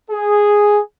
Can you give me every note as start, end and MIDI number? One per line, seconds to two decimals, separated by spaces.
0.11 0.80 68